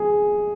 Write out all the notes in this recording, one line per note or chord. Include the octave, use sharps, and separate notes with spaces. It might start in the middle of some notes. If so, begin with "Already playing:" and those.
Already playing: G#4